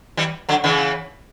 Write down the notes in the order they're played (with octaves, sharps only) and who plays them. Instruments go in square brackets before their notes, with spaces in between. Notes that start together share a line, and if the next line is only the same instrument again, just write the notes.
[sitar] E3 G3
D3 F#3
C#3 E3